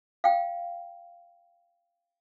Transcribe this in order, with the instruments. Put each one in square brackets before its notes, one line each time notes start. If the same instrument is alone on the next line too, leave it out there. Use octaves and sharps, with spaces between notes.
[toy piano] F5 G5